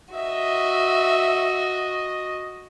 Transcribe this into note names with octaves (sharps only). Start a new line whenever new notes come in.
F#4 D#5 E5